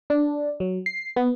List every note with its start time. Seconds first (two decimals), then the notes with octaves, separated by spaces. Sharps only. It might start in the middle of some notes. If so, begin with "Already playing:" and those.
0.10 D4
0.60 F#3
0.86 C7
1.16 B3